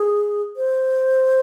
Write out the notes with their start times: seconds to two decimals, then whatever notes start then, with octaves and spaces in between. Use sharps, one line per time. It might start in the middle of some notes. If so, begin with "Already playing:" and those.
Already playing: G#4
0.56 C5